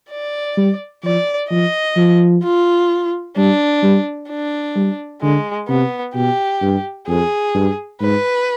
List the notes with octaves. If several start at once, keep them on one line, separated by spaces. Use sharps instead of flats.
D5
G3
F3 D5
F3 D#5
F3
F4
G3 D4
G3
D4
G3
D3 G#3
C3 B3
B2 G4
G2
F2 G#4
G2
G#2 B4